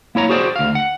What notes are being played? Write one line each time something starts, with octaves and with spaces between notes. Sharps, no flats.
A#3 E4 C#5 A#5
F#4 G#4 C5 D5
D2 F5
F#5